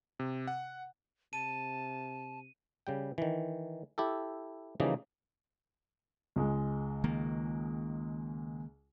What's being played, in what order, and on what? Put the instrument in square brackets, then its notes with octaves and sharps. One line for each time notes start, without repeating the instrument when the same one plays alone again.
[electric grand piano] C3
F#5
[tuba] C3 [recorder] A5 [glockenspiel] D#7
[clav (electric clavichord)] C#3 G3 G5
D#3 E3
E4 G4 A4
C#3 E3 F3 G3 A#3 D#4
[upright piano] C#2 G#3
[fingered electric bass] D#3 A#3